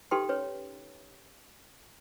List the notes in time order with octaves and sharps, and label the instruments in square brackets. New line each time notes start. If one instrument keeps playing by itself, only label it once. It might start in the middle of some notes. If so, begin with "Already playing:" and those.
[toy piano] D#4 G4 A4 B4 G5 C6
C#4 B4 C#5